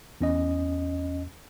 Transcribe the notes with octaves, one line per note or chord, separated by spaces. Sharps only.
E2 C#4 D#5